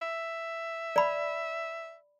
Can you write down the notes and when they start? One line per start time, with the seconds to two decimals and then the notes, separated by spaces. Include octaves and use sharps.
0.01 E5
0.96 D5 B5